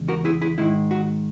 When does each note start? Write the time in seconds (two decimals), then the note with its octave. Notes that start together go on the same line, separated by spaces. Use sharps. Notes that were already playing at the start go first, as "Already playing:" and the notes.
Already playing: E2 C#3 G#3
0.08 F#4 A#4
0.25 E4 G#4
0.42 E4 G#4
0.58 G#2 D#3 G#3 E4
0.91 F#4